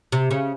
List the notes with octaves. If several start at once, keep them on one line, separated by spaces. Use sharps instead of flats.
C3
C#3